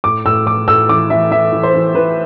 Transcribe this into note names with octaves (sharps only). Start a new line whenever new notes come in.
A2 D6
A2 E6
A2 D6
A2 E6
E3 D6
E3 E5
E3 E5
E3
C5
E3
E3 B4